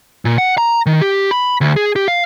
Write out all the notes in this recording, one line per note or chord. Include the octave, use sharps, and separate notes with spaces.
A#2
F#5
A#5
D#3
G4
B5
D2
G#4
G4
F5